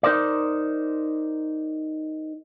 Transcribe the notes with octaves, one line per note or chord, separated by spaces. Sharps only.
D#4 A#4 C5 D5